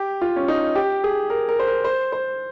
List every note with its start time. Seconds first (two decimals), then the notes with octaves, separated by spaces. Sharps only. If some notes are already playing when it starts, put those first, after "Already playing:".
Already playing: G4
0.22 F4
0.36 C#4
0.48 D#4
0.75 G4
1.04 G#4
1.30 A#4
1.49 A#4
1.59 C5
1.67 A#4
1.84 C5
2.12 C5